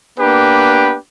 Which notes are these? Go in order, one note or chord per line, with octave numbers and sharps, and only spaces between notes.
A#3 B3 D4 G4 B4